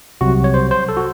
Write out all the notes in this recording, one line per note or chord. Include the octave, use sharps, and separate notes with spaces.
C2 C3 F#3 F#4
C#5
C5
C5
A4
F#4